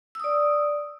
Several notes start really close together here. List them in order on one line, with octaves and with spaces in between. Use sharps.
E6 D#6 D5